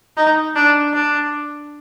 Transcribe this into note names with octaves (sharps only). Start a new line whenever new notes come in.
D#4
D4
D4